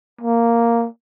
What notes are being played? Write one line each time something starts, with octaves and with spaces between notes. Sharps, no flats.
A#3